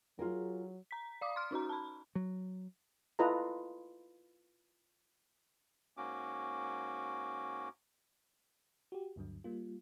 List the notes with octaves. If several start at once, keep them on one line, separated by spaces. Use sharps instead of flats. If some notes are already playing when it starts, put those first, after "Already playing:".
F#3 F4 G#4 A#4
A#5 B6
D5 F5 D6 D#6
C6 F6
C#4 D#4 F#4 A#5
A5 B5
F#3
E4 F4 A4 B4 D#5 A#5
G#2 A#3 C#4 F#4 D6
F#4 G4
D2 G2 D3 F#3
G3 A#3 F4